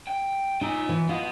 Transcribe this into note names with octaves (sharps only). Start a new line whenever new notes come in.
G5
D#4 F4 G#5
E3
B3 F4 D#5